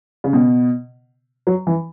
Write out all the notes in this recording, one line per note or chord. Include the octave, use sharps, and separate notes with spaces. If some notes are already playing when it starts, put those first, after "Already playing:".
C#3
B2
F#3
E3